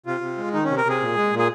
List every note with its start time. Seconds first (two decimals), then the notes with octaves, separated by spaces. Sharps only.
0.06 C3 F4
0.21 C3
0.38 G#3
0.53 D#3 D#4
0.65 C3 C#4
0.77 A#4
0.85 C3 G#4
1.00 A#2
1.16 G#3
1.33 A#2
1.39 G#4